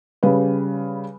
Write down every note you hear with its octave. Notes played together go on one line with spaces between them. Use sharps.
C#3 G3 B4